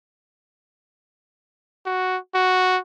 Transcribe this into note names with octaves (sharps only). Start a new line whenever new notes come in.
F#4
F#4